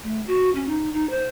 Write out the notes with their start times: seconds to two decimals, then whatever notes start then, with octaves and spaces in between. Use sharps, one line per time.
0.03 A3
0.27 F#4
0.55 C#4
0.68 D#4
0.93 D#4
1.10 C5